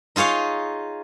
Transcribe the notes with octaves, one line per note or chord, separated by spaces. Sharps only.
D#4 F4 G#4 C#5 F5